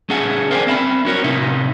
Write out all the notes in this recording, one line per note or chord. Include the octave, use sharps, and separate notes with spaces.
C#4 G#4 A4 E5 F#5 G#5
A#4 C5 D5 F5 G5 G#5
C4 E5 A#5 B5
C#4 F#4 A#4 C#5
A2 C3 D#4 E4